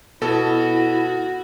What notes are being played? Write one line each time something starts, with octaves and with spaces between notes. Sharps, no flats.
B2 E4 F#4 A4